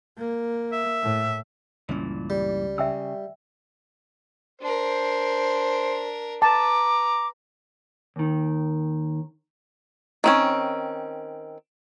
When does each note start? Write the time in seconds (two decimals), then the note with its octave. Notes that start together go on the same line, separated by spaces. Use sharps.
0.18 A#3
0.73 E5
1.03 A2
1.89 C#2 G2 A#2 E3 C#4
2.30 G3
2.78 C#3 E5 G5 E6
4.61 D4 A#4 C5
6.42 B4 A5 A#5 D6
8.16 D#2 D#3
10.24 D#3 C4 C#4